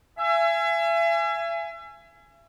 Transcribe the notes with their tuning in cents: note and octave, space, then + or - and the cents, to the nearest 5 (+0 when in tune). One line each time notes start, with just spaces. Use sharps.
E5 +40 G#5 +0